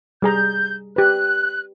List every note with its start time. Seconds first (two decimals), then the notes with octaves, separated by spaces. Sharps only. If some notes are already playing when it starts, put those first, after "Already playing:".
0.22 G3 G#4 A#5 G6
0.96 G4 B4 F#6